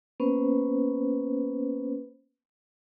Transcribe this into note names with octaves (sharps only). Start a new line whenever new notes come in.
A#3 B3 C#4 B4 C5